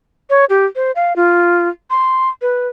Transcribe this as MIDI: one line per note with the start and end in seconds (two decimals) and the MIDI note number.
0.30 0.45 73
0.50 0.66 67
0.76 0.92 72
0.96 1.15 77
1.16 1.69 65
1.90 2.29 84
2.42 2.67 71